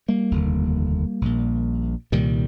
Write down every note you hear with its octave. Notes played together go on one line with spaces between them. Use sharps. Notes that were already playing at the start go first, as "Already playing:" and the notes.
G3 A#3
F1 D#2 D3
A#1 A#2
C2 A#2 D#3 G3